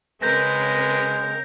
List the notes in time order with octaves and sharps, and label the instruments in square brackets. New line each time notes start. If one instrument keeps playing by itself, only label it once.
[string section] C#3 C4 A#4 [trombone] G#3 [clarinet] B4 [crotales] G6 A#6